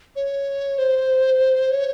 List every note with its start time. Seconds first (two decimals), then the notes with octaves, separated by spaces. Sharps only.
0.16 C#5
0.78 C5
1.71 C#5